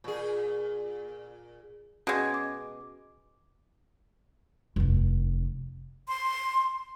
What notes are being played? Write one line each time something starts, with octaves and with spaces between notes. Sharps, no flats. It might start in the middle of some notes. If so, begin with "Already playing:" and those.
A#2 G#4
B2 G#3 C#4 G#4 G#6
D6
F1 D#2
C6